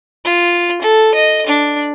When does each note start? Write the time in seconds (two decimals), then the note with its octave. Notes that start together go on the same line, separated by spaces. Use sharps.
0.25 F4
0.82 A4
1.15 D#5
1.47 D4